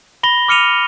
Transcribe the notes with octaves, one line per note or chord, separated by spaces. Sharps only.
B5 A#6 G7
D6 F6 C#7 D#7 F7